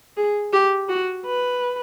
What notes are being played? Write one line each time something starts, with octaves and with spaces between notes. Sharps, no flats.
G#4
G4
F#4
B4